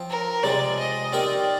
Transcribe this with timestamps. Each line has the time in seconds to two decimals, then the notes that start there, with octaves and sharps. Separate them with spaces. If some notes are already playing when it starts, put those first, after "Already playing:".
Already playing: F3 C4 F4
0.10 A#4
0.44 C3 F3 G#3 D5
0.79 D#5
1.12 C4 D#4 G4 A#4 D5 D#5